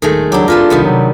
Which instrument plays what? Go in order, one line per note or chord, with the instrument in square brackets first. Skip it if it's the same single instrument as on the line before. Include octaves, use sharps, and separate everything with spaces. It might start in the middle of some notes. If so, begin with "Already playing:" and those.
[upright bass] D#1 A1 [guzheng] D#3 G#3 A3
[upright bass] C#2 G2 [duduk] F#3 [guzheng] D4 E4 G4
[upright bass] E1 F2 [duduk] F4 [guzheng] A#4 B4 A5
[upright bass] D1 C2 [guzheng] D#3 G3 B3
[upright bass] C3 C#4 [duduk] F#3